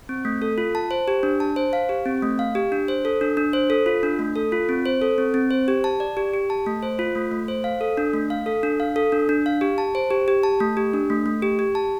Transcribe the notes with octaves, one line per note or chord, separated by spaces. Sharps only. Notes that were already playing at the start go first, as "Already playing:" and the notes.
C4
A3
A4
F4
A5
C5
G4
D4
A5
C5
F5
G4
C4
A3
F5
G4
D4
C5
A4
D4
D4
C5
A4
F4
D4
A3
A4
F4
C4
C5
A4
C4
C4
C5
G4
A5
D5
G4
G4
A5
A3
C5
F4
A3
A3
C5
F5
A4
D4
A3
F5
A4
D4
F5
A4
D4
D4
F5
G4
A5
C5
G4
G4
A5
A3
G4
D4
A3
A3
G4
G4
A5